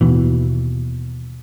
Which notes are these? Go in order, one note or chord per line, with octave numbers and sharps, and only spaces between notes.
D#2 B2 E3